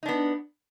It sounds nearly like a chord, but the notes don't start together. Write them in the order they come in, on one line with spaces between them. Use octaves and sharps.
D#4 D4 B3